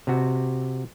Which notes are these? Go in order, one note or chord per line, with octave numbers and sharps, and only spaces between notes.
C3 F#4